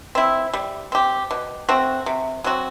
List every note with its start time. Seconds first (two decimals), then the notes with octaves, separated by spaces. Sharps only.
0.15 C4 E4
0.54 G3
0.92 C4 G4
1.31 B2
1.69 A3 C4 F#4
2.06 C3
2.44 F#3 C4 F#4